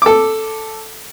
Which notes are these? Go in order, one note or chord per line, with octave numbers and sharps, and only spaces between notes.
A4 D6